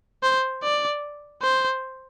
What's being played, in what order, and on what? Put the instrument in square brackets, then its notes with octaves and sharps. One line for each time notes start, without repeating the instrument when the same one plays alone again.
[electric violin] C5
D5
C5